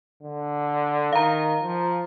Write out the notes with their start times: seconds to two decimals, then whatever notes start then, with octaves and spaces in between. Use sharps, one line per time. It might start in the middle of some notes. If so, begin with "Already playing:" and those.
0.22 D3
1.13 D#3 F5 A#5
1.63 F3